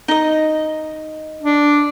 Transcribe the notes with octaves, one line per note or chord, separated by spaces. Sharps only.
D#4 D#5
D4